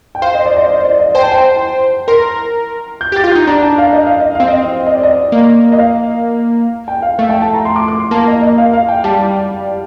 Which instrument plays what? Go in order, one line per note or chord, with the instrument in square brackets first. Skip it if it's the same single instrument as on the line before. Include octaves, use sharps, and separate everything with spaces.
[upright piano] G5
[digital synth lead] C5 [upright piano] F5
[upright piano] D#5
D5
D#5
D#5
D5
D#5
[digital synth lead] C5 [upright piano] G5
[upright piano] A5
G5
[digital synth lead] A#4 [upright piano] C6
[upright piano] G6
[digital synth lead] G4
[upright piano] A6
[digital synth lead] F4
[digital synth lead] D#4 [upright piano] G6
[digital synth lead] D4 [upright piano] A#5
[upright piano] A5
F5
D#5
F5
D#5
[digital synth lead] C4 [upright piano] F5
[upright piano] D#5
D#5
D5
D#5
[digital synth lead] A#3
[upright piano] D#5
F5
G5
F5
[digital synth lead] A3 [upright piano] F5
[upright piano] G5
A5
A#5
C6
D6
D6
C6
[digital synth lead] A#3 [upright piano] A5
[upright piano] D#5
D#5
F5
F5
G5
[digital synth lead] G3 [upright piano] A5